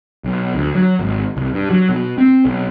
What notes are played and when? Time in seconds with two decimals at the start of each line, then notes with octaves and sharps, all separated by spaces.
0.24 B1
0.55 D2
0.75 F#3
1.00 G#1
1.37 C2
1.54 G2
1.71 F#3
1.89 B2
2.18 C4
2.45 B1